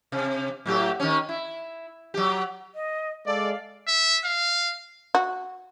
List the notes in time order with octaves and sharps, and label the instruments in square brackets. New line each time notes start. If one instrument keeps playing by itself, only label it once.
[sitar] C3
A2 F#3 G4
D#3 C#4
E4
F#3 G4
[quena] D#5
[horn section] G#3 A4 D5 [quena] F5
[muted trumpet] E5
F5
[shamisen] F#4